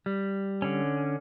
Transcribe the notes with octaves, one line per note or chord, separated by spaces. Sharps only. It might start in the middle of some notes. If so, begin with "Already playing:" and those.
G3
D3 C#4